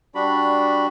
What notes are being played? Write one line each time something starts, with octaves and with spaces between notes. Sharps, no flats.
G3 D4 F#4 B5